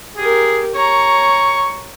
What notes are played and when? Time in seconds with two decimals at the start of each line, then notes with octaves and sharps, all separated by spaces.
0.17 G4 G#4 A#4
0.75 C#5 A#5 C#6